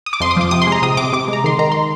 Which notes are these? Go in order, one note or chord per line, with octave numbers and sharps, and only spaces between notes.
D#6
D6
F2 C6
D#6
F3 D6
C3 D#6
C6
G#3
A#5
C3 D#6
C3 D6
C3 D6
G#3
A#5
D#3 C6
D#3 A#5
C6